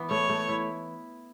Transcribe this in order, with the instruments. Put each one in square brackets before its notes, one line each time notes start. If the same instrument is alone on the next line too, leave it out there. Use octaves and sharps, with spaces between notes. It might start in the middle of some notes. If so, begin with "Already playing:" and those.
Already playing: [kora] E3 B3
[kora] A3 [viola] C#5
[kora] A3
E4